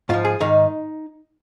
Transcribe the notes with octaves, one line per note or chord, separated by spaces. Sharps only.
G#2 F3 F4
G#4
G#2 D#3 D#4